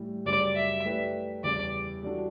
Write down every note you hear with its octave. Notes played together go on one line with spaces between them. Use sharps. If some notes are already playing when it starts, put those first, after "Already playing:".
Already playing: A2 E3 G3
F#2 C#3 G3 D5
E5
A3 E4 G4 B4 D5
E2 C#3 G3 C#4 D5
E3 G3 D4 F#4 A4